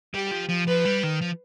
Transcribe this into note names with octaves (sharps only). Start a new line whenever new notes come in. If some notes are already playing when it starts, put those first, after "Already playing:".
G3 G4
F3
F3
F3 B4
G3
D#3
F3